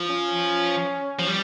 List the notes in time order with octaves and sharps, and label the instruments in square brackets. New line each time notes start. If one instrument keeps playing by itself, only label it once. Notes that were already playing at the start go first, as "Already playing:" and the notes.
Already playing: [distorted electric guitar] F3
[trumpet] C#4
[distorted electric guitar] F3
G3